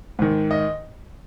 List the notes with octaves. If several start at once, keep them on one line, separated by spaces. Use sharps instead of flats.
G#2 D#3
D#5